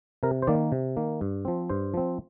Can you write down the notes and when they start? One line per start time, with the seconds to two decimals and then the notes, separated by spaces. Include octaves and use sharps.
0.23 C3 A#4
0.42 C5
0.47 D#3 A#3 D5
0.72 C3
0.97 D#3 A#3
1.21 G2
1.45 F3 C4
1.69 G2 C5
1.94 F3 C4